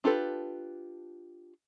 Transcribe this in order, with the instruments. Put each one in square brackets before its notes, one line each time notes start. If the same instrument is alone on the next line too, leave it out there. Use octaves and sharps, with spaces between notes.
[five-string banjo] D4 F4 G4 A4 B4